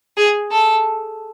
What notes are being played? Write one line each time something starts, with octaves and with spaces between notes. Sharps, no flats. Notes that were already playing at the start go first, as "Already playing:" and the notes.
G#4
A4